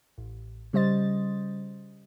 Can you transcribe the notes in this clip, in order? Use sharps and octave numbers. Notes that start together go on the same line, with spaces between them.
A1
C#3 G3 C5 D#5 A6